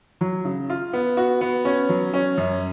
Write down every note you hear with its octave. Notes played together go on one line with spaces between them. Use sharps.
F#3
C#3
F4
B3
F#4
B3
C#4
F#3
C#4
F#2